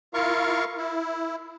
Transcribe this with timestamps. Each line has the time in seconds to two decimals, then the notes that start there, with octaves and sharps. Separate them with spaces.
0.14 E4 F4 A#4 F5 C#6
0.78 E4